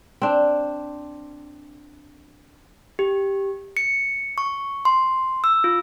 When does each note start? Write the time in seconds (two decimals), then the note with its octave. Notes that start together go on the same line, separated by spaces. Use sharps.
0.22 C4 D4
2.99 G4
3.77 C#7
4.38 C#6
4.85 C6
5.44 E6
5.64 F4